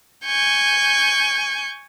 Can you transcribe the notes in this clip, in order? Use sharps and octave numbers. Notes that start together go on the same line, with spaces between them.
G#5 C#6 G6